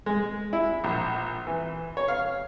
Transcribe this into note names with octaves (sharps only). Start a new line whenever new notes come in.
G#3
E4
A#1
E3
C#5
F5